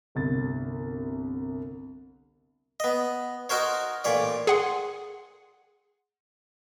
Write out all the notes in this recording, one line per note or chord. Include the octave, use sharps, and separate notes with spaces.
G1 C2 A6
B3 D#5
D#4 F#4 A#4 C5 C#5
A1 A#2 C#5 D5
G#4 F#5 C6